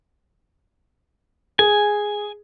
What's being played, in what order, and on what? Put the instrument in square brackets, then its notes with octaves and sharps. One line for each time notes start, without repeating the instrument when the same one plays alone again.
[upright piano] G#4 [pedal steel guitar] G#5